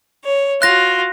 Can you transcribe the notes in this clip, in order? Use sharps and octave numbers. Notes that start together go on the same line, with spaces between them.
C#5
F4 F#4 F#6 A#6